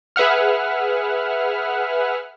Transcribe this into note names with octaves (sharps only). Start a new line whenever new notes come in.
G#4 B4 E5 F#5 F6